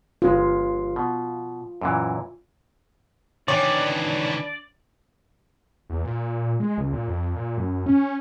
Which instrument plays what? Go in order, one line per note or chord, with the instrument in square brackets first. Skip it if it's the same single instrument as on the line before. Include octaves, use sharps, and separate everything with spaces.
[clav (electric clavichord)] G1 G#3 [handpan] F4
[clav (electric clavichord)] B2
F#2 A#2 E3
[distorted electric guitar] D#3 E3 [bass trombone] D4 [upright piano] C#5 [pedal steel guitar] D5
[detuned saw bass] E2
A#2
G#3
C#2
A#2
F2
A#2
F#2
C#4